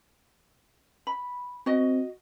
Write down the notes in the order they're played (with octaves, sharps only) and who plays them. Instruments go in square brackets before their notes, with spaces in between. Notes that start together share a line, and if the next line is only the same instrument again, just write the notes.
[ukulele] B5
[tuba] C4 [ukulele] F#4 D#5